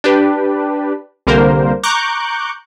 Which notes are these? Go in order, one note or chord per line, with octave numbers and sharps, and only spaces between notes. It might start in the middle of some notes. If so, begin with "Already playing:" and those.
D4 G4 B4
C2 D3 G3 A#3 A#4 C5
A#5 C#6 D6 F#6 G6